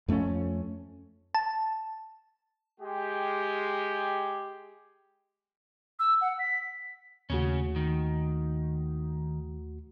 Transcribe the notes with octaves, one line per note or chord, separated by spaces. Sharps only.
F2 A3 A#3 C#4
A5
G#3 G4
E6
F#5
B6
D#2 C#3 A3 C#4 F#4
D#3